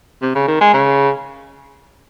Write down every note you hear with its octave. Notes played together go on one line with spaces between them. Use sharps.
C3
C#3
D#3
G#3
C#3